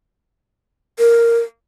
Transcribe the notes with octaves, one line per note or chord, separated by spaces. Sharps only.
A#4